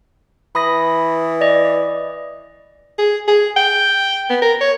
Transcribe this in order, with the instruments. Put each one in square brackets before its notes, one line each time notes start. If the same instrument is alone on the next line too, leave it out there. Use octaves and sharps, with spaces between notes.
[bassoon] E3 [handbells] B5 D#6 A#6
[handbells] D5 D#5
[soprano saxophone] G#4
G#4
G5
B3
A#4
C#5